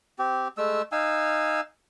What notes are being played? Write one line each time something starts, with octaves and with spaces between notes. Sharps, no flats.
C4 G4
G#3 A3 E6
D#4 F5 G#5 E6